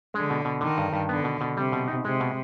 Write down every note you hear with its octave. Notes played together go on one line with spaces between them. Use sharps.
D3 G#3
B2
B2
D3 D#3
G2
G2
D3 B3
B2
B2
C3 G3
B2
D#4
C3 G#3
B2